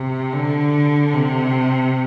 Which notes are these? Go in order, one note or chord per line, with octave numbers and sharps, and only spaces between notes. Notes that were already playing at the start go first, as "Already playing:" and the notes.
Already playing: C3
D3
C3